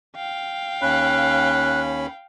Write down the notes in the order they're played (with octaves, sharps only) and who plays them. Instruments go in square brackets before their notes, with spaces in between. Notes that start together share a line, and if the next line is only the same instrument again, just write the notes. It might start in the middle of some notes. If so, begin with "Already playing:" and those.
[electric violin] F5 G5
[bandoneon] D#2 C#4 B5 [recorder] F#6